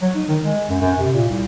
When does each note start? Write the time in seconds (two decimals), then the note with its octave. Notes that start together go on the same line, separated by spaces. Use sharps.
0.02 F#3
0.15 D#4
0.28 D#3
0.43 G#3
0.69 F#2
0.81 F#2
0.98 C3
1.14 A#2
1.29 C2